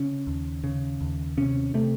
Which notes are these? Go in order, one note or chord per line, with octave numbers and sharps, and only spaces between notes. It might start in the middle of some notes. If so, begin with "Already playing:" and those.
Already playing: C#3 C#4
D#2
C#3
D#2
C3 C#4
C3 A3